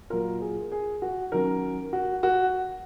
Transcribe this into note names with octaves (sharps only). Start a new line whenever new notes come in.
A#2 F#3 A#3 F4 A#4
G#4
G#4
F#4
D#3 F#3 C#4 A#4
F#4
F#4